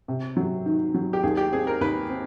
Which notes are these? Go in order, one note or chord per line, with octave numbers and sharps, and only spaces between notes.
C3
F#3
D#3
F#3
G4
D#2 G#4
G4
C4 G#4
A#4
D#2 B4
C4